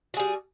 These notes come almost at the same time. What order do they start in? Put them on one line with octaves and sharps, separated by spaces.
F#4 G#4 G3